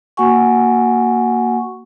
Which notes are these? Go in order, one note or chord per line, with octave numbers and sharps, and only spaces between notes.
A#3 F#4 F#5 G#5 C#6